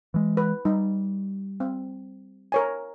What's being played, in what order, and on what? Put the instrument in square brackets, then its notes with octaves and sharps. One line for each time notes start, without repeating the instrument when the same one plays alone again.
[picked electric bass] E3 G#3
[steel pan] B4
[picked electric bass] G3 [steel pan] D#4
[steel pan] C4
A#4 C#5 G#5